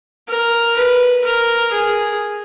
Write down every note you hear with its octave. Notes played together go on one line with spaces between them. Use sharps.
A#4
B4
A#4
G#4